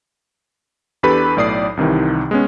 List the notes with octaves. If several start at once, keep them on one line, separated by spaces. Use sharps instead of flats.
E2 D4 G4 A4 B4 B5
B1 A2 D5 D#6 C7
C2 C3 D#3 E3
G#3 B3 C#4